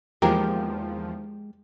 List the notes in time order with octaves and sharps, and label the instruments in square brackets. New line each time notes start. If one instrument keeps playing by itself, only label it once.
[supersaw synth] E2 F3 [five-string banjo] D#3 A#3 A#4 [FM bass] G#3 [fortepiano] G4